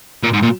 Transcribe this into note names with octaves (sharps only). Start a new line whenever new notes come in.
A#2
G#2
A#2